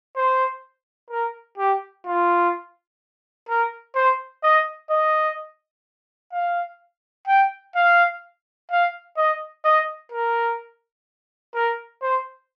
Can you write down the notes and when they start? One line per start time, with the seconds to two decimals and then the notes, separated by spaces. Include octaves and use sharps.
0.16 C5
1.10 A#4
1.58 G4
2.06 F4
3.48 A#4
3.95 C5
4.43 D#5
4.90 D#5
6.32 F5
7.27 G5
7.75 F5
8.70 F5
9.17 D#5
9.64 D#5
10.12 A#4
11.55 A#4
12.02 C5